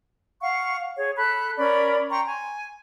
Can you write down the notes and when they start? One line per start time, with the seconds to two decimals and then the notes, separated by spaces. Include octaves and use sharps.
0.42 F5 F#5 C#6
0.97 G#4 C#5
1.17 A4 B5 F#6
1.57 C#4 A#4 D5 B5
2.11 G5 A#5 C6 C#6
2.25 G#5